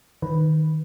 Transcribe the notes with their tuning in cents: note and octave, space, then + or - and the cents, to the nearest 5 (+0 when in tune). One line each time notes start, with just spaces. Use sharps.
D#3 +0 B4 +0